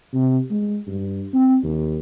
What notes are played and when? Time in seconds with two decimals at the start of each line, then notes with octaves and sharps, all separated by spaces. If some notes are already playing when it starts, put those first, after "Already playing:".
0.13 C3
0.51 G#3
0.87 G2
1.33 C4
1.63 D#2